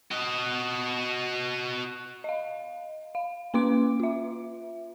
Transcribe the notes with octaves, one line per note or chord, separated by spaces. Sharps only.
F#4 D#5
D#5 F5
F5
A#3 C#4 B4 C6 D6 D7
F4 E5